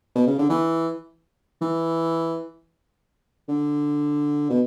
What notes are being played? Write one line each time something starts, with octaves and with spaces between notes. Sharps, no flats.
B2
C#3
D3
E3
E3
D3
B2